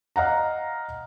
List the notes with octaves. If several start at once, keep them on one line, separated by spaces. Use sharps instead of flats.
D#5 F5 F#5 A#5